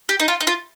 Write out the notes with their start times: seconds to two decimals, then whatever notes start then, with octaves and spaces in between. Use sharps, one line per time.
0.09 G4
0.20 D#4
0.28 F4
0.40 D#4
0.47 F4